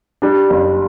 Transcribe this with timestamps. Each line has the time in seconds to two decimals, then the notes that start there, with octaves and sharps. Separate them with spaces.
0.22 G3 D4
0.50 F#1